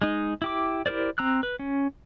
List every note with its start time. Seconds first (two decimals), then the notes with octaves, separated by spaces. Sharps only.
0.02 G#3 D#4
0.42 E4 G4 D6
0.86 E4 G4 A#4 C5 D5
1.18 C4 A#5 E6 F#6
1.43 B4
1.59 C#4